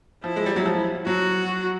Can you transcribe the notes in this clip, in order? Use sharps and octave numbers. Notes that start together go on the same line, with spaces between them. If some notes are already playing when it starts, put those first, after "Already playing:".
F3 E4
G#3
G3
F#3
F3
F#3 F#4